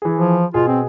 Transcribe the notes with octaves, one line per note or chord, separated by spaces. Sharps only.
E3 G#4
F3
B2 B3 F4 G#4
C4